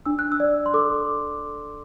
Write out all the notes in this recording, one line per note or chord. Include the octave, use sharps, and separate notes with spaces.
D4 E6
F#6
E6
D5
C6
A4 D6